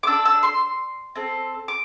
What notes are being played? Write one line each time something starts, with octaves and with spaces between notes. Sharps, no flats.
D6
D4 A4 E6
E6
C6
C4 A4
D6